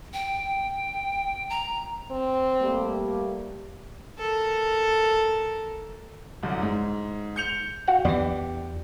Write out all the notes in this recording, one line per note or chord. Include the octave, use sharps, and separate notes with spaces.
G5
A#5
C4
G3 A3 A#3
A4 A#4
C2 F#2 D3
G#2
G6 C#7 F7
F#4 F5 F#5
E2 E3 D4 G4 D5